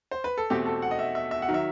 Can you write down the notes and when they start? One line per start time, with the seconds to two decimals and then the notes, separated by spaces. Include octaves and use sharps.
0.11 C5
0.24 B4
0.37 A4
0.50 E2 B2 A3 C4 G4
0.66 A4
0.82 F#5
0.91 D#5
0.99 E5
1.15 E5
1.31 E5
1.42 F#5
1.48 D#3 F#3
1.54 E5